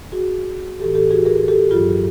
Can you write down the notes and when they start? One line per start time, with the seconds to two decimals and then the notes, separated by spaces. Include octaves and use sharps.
0.12 F#4 G#4
0.80 A2 E3 G4 A4
0.95 G4 A4
1.11 F#4 G#4
1.25 G#4 A#4
1.48 G4 A4
1.71 G2 D#3 F#3 F4 G4